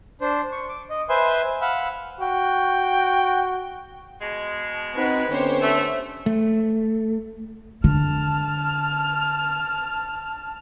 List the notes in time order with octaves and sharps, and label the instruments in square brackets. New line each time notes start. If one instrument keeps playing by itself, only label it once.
[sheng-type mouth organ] D4 C5
C#6
D6
D#5
B4 C5 E5 G#5 C6
F5 F#5 B5 E6
[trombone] F#4 [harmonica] G5
[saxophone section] B2 G#3
[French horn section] C4 D#4 [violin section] F#4 [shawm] B4
[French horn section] D3 B3 C#4 [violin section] G4 C5 C#5
[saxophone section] A3 [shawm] E5
[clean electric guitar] A3
[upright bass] D3 [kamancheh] A5 F6